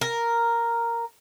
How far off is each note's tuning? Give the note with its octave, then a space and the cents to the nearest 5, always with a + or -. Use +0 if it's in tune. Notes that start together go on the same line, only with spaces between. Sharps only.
A#4 +0